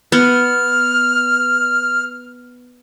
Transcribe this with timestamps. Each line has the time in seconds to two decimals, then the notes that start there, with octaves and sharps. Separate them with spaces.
0.12 B3 F6